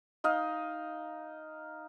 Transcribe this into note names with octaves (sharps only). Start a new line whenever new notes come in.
D#4 D#5 F5